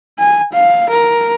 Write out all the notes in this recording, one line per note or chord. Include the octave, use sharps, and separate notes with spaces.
G#5
F5
A#4